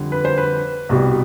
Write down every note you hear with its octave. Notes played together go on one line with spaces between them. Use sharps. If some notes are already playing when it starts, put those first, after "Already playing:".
Already playing: F2 D3 G3
B4
C5
B4
C2 B2 G3